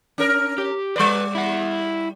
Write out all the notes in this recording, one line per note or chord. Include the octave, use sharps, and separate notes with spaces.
C#4 A#4
G4
G3 B4 D5 C6
E4 F#5